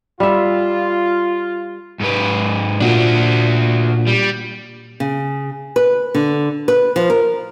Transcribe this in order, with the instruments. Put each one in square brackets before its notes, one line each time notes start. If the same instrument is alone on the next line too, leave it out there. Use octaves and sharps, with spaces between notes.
[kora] G3 E5 [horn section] F4
[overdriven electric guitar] G#2 B4
[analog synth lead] A#2 [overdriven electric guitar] D4 F#4
[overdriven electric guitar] G3
[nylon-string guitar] C#3
B4
D3
B4
F3
A#4